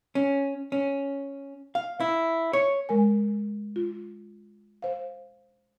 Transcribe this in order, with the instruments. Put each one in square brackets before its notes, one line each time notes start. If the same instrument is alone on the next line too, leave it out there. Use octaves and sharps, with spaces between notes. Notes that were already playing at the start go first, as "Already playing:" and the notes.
[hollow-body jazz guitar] C#4
C#4
F5
E4
C#5
[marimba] G#3 A#4 G#5
F4
C5 F5